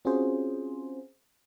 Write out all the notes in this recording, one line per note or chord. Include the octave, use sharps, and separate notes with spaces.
C4 C#4 F4 F#4 G#4 C5